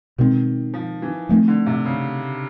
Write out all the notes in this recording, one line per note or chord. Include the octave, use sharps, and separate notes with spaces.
B2 D#3 G#3 C4
F3
E3
D#3 F3 A3 C4
D3
C3
C#3